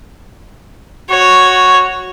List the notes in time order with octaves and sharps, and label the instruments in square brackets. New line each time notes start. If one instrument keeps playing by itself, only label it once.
[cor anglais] F#4 [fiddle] C#5